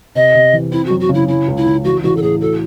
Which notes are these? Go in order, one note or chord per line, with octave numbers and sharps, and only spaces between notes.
C3 D#5
C3
E3
C4 E4
F#2 F#4
F#4
C#3
E4
C#4 E4
C#2
E4
C#3
A1 F#4
A1 F#4
A4
A2 G#4
F#4 A4